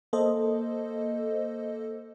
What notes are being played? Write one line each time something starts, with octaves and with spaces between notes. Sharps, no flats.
A#3 A4 C5 D#5